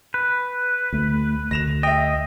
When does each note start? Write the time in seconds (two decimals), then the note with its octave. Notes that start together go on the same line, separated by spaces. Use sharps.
0.14 B4
0.93 D2 A3
1.51 D2 A#6 E7 F7
1.83 D#5 E5 G5